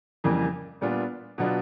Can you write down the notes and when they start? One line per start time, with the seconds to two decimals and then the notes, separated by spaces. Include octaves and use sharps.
0.24 F2 C#3 E3 G3 A#3
0.81 A#2 G3 B3 D4 F4
1.38 B2 F#3 B3 D4 F4